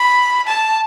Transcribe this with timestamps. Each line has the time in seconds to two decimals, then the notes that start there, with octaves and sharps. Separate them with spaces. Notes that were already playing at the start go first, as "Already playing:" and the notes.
Already playing: B5
0.47 A5